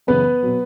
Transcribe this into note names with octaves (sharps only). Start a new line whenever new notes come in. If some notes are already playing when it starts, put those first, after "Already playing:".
F#2 C#3 E3 B3 B4
B2 F#3